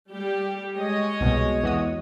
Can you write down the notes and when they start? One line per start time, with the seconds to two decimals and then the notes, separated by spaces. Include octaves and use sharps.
0.11 G3 G4
0.75 G#3 C#5 D#5
1.20 C2 B2
1.63 E2 F#4 D#6